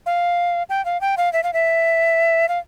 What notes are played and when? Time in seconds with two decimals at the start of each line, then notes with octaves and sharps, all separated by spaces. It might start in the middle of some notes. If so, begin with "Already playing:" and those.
0.06 F5
0.70 G5
0.85 F5
1.01 G5
1.17 F5
1.33 E5
1.43 F5
1.53 E5
2.49 F5